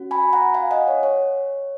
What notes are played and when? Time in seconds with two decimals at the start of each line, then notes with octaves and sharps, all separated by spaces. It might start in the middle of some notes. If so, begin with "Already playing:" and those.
Already playing: C#4 F#4
0.11 G#5 B5
0.33 F#5 A#5
0.54 F5 G#5
0.71 D#5 F#5
0.87 C#5
1.03 C#5